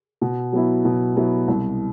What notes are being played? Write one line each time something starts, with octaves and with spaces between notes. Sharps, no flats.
B2
F#3 B3 E4
B2
F#3 B3 E4
C2